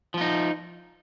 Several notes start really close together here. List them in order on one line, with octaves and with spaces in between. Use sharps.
F3 F4 D#4